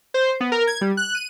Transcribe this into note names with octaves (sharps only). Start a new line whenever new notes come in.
C5
B3
A#4
G#6
G3
F#6
D#7